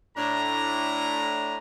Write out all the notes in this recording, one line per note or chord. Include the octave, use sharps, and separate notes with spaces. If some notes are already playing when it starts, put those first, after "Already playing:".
A2 D4 A#5